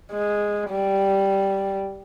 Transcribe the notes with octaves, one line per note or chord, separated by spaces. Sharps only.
G#3
G3